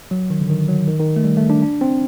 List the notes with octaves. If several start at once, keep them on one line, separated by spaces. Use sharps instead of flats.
F#3
D#3
D3
D#3
F#3
D#3
D#3
A3
G3
A3
D4
D4
C4